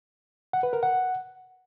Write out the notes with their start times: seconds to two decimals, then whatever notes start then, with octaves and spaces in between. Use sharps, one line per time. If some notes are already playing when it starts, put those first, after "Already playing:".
0.53 F#5
0.63 B4
0.73 A#4
0.83 F#5